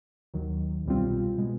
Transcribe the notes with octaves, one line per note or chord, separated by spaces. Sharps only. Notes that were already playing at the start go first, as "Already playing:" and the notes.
D#2 D#3 F#3
C2 B2 G3 C4 F4
B2 G#3 B3